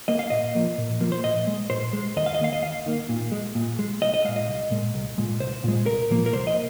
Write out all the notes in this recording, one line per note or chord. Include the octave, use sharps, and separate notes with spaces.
A#3 D#5
F5
A#2 D#5
F3 A#3
A#2
F3 A#3
C5
A#2 D#5
G#3
A#2 C5
G#3
D#2 D#5
F5
D#5
D#3 A#3 F5
D#5
D#2 F5
D#3 A#3
A#2
G#3
A#2
G#3
C2 D#5
D#5
A#2 G#3 F5
D#5
C2
A#2 G#3
C2
A#2 G#3
C2 C5
A#2 G#3
C2 A#4
A#2 F3 A#3
A#4
C2 C5
D#5